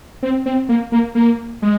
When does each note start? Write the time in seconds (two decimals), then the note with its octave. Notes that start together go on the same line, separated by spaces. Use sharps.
0.23 C4
0.46 C4
0.69 A#3
0.92 A#3
1.15 A#3
1.62 G#3